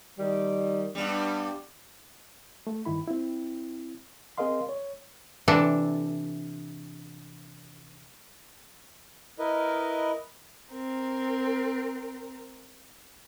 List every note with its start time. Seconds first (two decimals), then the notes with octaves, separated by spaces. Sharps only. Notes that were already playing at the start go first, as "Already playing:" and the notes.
0.18 D#3 G3
0.95 G2 G3 B3 D4
2.67 A3
2.85 G2 D#3 E4 B5
3.08 C4 E4
4.38 C4 G#4 A#4 D#5 F5 C6
4.69 C#5
5.48 C3 E3 D4 A4
9.39 E4 A#4 B4 D#5
10.72 C4 A#4